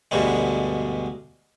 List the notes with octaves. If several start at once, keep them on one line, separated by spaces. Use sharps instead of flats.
D2 G2 B2 G3 G#3